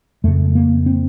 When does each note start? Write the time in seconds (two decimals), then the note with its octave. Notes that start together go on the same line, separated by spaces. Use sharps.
0.24 F2 C#3 A3
0.55 A#3
0.86 C4